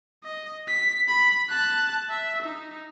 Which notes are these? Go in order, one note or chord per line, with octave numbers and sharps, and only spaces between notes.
D#5
B6
B5
A5 F#6
E5
D#4